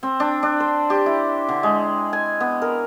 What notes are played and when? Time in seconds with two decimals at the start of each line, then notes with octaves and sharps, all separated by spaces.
0.03 C4
0.20 D4
0.43 D4
0.60 C5
0.90 G4
1.06 E4
1.49 D3
1.63 G#3
2.13 G#5
2.40 B3
2.62 A#4